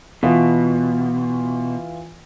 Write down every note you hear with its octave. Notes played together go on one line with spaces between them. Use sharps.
B2 E3 F4 B4